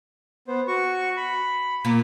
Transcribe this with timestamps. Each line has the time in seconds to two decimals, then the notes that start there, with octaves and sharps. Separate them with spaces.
0.48 B3 C5
0.68 F#4 C#6
1.17 B5
1.85 A#2